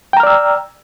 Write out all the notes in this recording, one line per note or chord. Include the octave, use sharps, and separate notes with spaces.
D5 G5 A#5 E6 F6